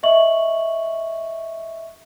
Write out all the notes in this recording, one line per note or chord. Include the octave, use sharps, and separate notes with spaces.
D#5 E5 C#6 F#7